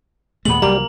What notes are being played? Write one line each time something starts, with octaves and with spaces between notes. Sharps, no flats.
D#2 A#2 G#3 A3 B3 F#7
C2 F#3 G3 A#3 A#5